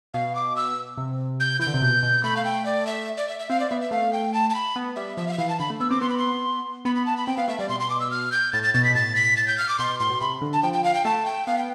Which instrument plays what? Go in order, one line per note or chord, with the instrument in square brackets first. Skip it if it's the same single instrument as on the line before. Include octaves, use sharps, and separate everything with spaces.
[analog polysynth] B2 [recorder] F5
[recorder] D6
E6
[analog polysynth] C3
[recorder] G6
[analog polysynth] E3 [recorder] G6
[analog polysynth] D3
C3
B2
B2
[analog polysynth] A3 [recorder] B5
[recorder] F5
G5
D5
E5
D5
E5
E5
[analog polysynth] C4 [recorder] F5
[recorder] D5
[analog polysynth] B3 [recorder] E5
[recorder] E5
[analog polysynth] A3 [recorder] F5
[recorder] G5
A5
A5
B5
[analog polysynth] B3
[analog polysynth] G3 [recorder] E5
[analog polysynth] F3 [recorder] E5
[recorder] F5
E5
[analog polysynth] E3 [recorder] F5
[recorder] A5
[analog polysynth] D3 [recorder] B5
[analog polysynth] A3
[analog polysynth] B3 [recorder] E6
[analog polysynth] C4 [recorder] D6
[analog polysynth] B3 [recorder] C6
[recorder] B5
C6
[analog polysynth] B3 [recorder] B5
[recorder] B5
A5
B5
[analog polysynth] C4 [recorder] G5
[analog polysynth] B3 [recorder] F5
[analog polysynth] A3 [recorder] E5
[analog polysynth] G3 [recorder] D5
[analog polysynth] B2 [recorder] C6
[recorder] C6
D6
E6
F6
G6
[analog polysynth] A2 [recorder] A6
[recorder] A6
[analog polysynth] B2 [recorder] A6
[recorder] B6
[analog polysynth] B2
[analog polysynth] A2 [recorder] A6
[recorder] B6
A6
G6
F6
D6
[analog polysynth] B2 [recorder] C6
[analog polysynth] B2
[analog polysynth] A2 [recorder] C6
[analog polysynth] B2
[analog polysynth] C3 [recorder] B5
[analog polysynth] D3
[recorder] A5
[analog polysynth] F3 [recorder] G5
[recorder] G5
F5
G5
[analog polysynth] A3 [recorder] A5
[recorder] G5
[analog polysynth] B3 [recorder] F5
[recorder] G5